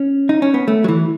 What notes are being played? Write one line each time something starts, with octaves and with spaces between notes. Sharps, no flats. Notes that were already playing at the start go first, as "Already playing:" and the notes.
Already playing: C#4
D#4
C#4
B3
A3
F#3
E3